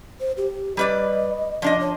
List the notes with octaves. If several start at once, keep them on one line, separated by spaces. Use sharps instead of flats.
C5
G4
G3 B4 D5 D#5
F3 D4 D5 D#5
C#5